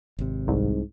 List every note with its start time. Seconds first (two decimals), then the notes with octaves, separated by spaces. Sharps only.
0.19 G#1 C3
0.48 C2 G#2